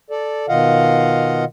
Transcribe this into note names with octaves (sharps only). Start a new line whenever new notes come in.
A4 D5
B2 D#3 F4 D#5 F5 F#5